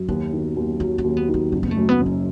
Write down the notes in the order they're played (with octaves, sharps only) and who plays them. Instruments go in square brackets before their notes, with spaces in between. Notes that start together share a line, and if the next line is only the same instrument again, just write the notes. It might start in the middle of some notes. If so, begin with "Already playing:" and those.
Already playing: [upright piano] F#2
[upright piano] D#2 [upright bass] B3
[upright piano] D#3
D#2
[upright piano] F#3 [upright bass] C#4
[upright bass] C#4
[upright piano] D#2
[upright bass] B3
[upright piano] D#3
[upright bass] B3
[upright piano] F#1 [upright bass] B3
[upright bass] B3
A3
[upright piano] F#2
[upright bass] B3
[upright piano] F#1
[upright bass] C#4